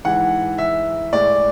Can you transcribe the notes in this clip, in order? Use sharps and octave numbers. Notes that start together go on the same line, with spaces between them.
G#2 E3 G#3 F#5
E5
A2 G#3 D5